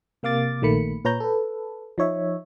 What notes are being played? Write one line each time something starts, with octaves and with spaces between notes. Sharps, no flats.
C3 A#3 F5 D6 A6
A#1 D#3 A3 A#3 B5 C#7
A#2 B4 C#5 A#5 G6
A4 B4
F3 D#4 C#5 E5